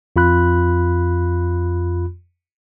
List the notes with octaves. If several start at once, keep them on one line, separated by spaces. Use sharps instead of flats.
F2 F4 B5 F#6